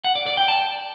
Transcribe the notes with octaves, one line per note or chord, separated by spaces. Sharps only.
F#5
D5
D5
G5
A5